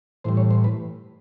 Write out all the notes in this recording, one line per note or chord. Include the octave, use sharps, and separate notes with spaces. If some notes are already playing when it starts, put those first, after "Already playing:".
A2 E3 G3 C5
C#5
C5
B4